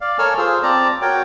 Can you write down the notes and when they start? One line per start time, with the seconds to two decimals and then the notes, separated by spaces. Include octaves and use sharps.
0.01 D5 F5
0.19 A4 A#4 C#5 G#5 E6 F6
0.38 F4 G#4 C5 E6
0.63 C4 D5 A5 A#5
1.02 F#4 A#4 C#5 G5